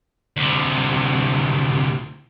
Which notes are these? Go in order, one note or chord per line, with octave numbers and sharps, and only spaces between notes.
D2 C3